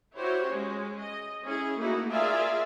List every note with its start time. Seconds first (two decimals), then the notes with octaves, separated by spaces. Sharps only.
0.18 E4 F#4 G4 C5 C#5
0.49 G#3 C#4
0.99 D#5
1.42 C#4 E4 G#4
1.77 A3 A#3 D#4 E4 F#4
2.09 F4 G#4 A#4 D5 E5 F5